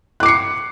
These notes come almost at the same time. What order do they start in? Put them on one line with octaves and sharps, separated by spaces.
F#6 D6 C7 C#7